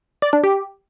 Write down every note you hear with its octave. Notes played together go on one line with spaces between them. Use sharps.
D5
D4
G4